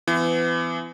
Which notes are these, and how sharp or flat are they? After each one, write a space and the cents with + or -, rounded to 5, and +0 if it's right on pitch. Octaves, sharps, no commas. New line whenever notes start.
E3 +30 B3 +40